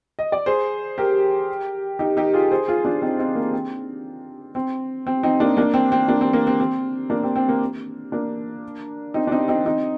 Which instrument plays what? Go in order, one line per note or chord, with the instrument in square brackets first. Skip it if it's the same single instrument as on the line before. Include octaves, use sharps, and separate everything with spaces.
[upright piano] D#5
D5
G#4 C5
G4 A#4
D#4 G4
D#4 G4
F4 G#4
G#4 C5
F4 G#4
D4 F4
C4 D#4
C4 D#4
A#3
C4
C4
C4
C4 D#4
A#3 D4
A#3 D4
C4
C4
A#3 D4
C4
A#3
C4
C4
A#3 D4
C4
C4
A#3
A#3 D4
C4 D#4
D4
C4 D#4
C4 D#4
C4 D#4